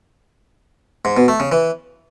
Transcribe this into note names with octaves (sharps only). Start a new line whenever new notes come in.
G#2
B2
A3
C#3
E3